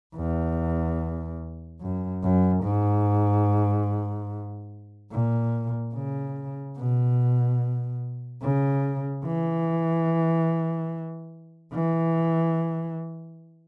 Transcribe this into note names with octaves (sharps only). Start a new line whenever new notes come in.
E2
F#2
F#2
G#2
A#2
C#3
B2
C#3
E3
E3